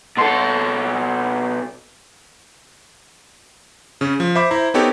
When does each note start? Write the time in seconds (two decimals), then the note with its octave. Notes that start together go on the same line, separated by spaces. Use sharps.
0.18 B2 A4 C6
4.01 C#3 C#4
4.20 F3
4.35 C5 E5 B5 D6
4.51 E4 C5 A#5
4.74 B3 C4 D#4 G4 A4 C#5